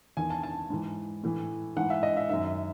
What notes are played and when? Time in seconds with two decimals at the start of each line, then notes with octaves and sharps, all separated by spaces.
0.17 E2 D#3 G#5
0.30 A5
0.43 A5
0.70 G#2 E3
1.23 A2 E3
1.76 G#2 E3 F#5
1.90 E5
2.03 D#5
2.17 E5
2.30 F#2 D#3 E5